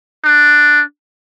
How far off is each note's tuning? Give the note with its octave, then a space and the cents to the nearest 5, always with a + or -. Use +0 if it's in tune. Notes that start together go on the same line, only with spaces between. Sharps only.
D4 +5